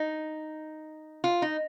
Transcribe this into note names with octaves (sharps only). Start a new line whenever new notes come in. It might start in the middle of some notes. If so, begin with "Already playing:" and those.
Already playing: D#4
F4
D#4